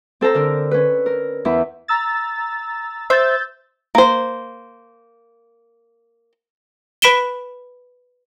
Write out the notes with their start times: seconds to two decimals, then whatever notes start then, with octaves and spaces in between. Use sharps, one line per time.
0.21 C4 A4 C5 A#5 E6
0.34 D3 A#4
0.71 C#4 B4
1.06 A#4
1.45 E2 E4 B5
1.88 A#5 E6 A6
3.10 C5 E5 E6 G6 A6
3.95 A#3 C5
7.02 B4 B5 B6 D7 E7 G7